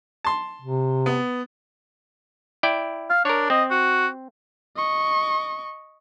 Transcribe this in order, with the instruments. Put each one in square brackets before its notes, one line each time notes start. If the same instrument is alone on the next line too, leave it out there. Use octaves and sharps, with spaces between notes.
[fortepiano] A5 C6
[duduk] C3
[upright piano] B3
[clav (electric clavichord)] E4 D5 G5
[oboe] F5
[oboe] D4 [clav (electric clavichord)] A#4 C#5
[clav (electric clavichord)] C4 [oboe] D#5
[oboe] F#4
[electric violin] D#5 C#6